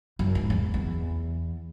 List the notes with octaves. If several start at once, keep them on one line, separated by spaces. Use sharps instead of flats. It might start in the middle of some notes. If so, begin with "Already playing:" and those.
F#2
G#2
E2
E2